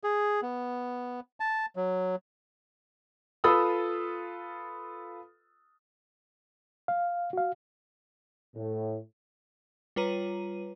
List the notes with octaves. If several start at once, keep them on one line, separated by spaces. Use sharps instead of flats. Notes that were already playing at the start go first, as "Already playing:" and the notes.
G#4
B3
A5
F#3
F4 A4 B4 B5 D#6 E6
F5
F#4 F5
A2
G3 F4 B4 C#5 A#5 D#7